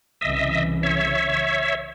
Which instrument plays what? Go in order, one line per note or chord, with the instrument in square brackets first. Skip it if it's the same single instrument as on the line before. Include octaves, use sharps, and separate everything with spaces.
[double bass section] C2 C#3 E3 [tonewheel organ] D#5 E5
[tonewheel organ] C#5 E5